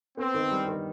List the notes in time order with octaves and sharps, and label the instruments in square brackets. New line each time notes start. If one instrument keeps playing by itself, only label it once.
[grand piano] B3 [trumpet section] C4
[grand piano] D#3
G3
D#3